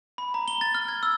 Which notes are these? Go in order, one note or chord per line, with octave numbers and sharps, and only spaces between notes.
B5
A#5
G7
A6
F6
G#6
E6